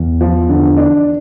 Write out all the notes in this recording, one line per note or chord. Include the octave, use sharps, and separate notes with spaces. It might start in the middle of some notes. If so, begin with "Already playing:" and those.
Already playing: E2
F3
D3
D4